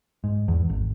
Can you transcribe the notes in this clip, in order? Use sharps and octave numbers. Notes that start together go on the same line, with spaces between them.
G#2
E2
G#1